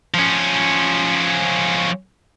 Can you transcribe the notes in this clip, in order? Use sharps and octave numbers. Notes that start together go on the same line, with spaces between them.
F3 C#4